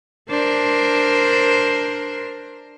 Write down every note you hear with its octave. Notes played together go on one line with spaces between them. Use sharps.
D4 A#4 C5